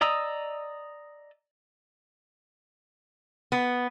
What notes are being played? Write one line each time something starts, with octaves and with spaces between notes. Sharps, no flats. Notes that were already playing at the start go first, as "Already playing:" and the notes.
D5 D#5 A#5 D#6 E6
B3